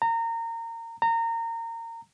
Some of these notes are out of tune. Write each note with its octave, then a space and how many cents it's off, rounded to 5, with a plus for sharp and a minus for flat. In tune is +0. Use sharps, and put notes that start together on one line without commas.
A#5 -25
A#5 -25